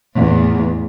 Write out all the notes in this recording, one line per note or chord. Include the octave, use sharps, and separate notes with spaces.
E2 A2